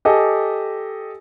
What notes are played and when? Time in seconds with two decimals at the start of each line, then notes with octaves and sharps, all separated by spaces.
0.05 G4 A4 D#5 G#5